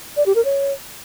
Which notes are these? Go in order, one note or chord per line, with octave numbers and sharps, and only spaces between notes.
D5
G4
A#4
C#5